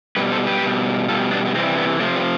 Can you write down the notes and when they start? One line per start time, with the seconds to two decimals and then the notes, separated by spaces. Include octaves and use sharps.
0.16 B2 G3 G4 B4
0.32 A4 C5
0.47 G4 B4
0.63 B2 G3
1.08 B2 G3 F4 A4
1.31 B3 D4
1.46 B3
1.54 C3 E3 G3 A3 C4
1.77 G3 B3
2.00 C3 F3 A3
2.15 G3 B3